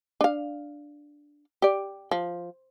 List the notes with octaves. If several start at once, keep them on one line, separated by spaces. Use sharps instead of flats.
D4 F5
G4 D5
F3